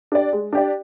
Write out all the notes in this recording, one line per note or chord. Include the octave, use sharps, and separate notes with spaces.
D4 G4 D5
G#3
D4 G4 D5